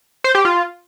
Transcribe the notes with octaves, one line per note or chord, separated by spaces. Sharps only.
C5
G4
F4